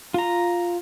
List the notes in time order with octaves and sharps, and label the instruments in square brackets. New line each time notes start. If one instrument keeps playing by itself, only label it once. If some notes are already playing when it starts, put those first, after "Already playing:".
[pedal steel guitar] F4 A#5